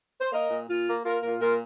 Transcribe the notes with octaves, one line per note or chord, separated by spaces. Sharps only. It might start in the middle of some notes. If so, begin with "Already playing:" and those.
C5
A#3 A#4 D#5
A#2
A#2 F4
A#3
A#3 F4 A#4
A#2 F4 A#4
A#2 F4 A#4